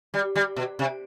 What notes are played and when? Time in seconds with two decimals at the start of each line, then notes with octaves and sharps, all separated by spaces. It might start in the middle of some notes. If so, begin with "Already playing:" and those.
0.14 G3
0.36 G3
0.57 B2
0.79 C3